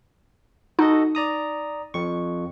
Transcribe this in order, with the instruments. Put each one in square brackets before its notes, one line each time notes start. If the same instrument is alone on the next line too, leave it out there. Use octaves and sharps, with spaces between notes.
[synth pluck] D#4 [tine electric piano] F#4 A4 D#5
[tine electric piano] D5 A#5 D#6
F2 C#6